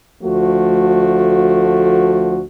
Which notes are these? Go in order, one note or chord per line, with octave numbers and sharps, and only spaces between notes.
D2 F3 A3 F#4